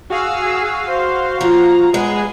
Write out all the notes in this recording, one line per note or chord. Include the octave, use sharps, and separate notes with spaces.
F#4 G#4 F5 E6
C5
F3 A#5
G#3 B3 G#4